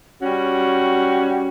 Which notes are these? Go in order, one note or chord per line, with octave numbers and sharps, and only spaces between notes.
G3 C#4 F#4